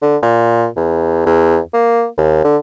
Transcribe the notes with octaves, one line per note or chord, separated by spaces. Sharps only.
D3
A#2
E2
E2
A#3
D#2
D3